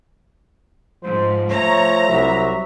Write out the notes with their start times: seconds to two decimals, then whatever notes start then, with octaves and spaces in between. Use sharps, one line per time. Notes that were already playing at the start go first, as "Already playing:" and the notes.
1.03 G#2 F3 C5
1.50 A3 C#5 A#5
2.09 C2 F#3 E5